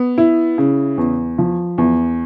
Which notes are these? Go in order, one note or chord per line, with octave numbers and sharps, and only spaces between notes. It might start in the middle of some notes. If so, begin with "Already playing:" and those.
Already playing: B3
E4
C#3
E2
F3
E2